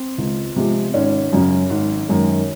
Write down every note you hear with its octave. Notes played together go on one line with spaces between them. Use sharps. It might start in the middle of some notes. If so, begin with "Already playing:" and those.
Already playing: C4
C#2
C3 F3 G#3
G#1 C#4
F#2 C#3 F#3
G#1
F#2 D#3 G#3